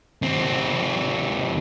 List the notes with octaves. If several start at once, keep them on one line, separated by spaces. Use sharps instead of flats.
D#2 C4